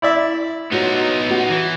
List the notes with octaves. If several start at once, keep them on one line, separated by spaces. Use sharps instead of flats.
E4 D5 E5
B3 D#4 F4 F#4 C#5
F#4
E3